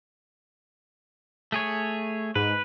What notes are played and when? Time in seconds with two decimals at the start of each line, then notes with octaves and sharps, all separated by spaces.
1.52 A3 G#4 C#5
2.35 G#2 B4